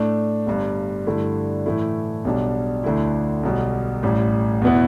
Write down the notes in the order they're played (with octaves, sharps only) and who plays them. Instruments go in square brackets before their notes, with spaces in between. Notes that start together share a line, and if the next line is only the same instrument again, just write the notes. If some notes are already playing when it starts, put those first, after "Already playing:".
Already playing: [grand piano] A2 A3 D4
G1 G2 G3
G2 D3 A3 E4
A2 E3 A3 E4
B1 B2 G3 D4
D2 D3 A3 E4
B1 B2 G3
A1 A2 G3
E2 B2 B3 E4